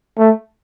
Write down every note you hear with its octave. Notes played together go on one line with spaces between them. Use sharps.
A3